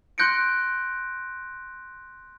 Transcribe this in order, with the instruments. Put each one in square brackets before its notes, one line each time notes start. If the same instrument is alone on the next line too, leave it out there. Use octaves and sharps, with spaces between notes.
[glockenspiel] C6 F#6 G6 A#6 C#7 D7